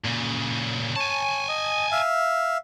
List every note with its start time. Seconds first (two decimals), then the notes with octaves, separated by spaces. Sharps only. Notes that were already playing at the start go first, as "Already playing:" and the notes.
0.04 A#2 C#3
0.96 C#5 G#5 A5
1.49 D#5
1.92 E5 F5